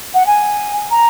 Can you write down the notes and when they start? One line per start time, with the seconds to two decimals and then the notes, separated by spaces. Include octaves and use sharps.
0.14 F#5
0.27 G#5
0.91 A#5